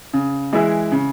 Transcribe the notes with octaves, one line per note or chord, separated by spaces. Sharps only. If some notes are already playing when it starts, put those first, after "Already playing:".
C#3
E3 G#3 E4
C#3